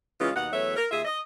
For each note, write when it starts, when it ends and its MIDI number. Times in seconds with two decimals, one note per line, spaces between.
0.19 0.30 49
0.19 0.30 52
0.19 0.30 56
0.19 0.30 61
0.19 0.30 65
0.35 0.47 39
0.35 0.47 47
0.35 0.47 63
0.35 0.47 78
0.52 0.75 40
0.52 0.75 54
0.52 0.75 57
0.52 0.75 71
0.52 0.75 73
0.52 0.75 76
0.76 0.85 70
0.90 1.00 39
0.90 1.00 65
0.90 1.00 68
0.90 1.00 76
1.05 1.19 75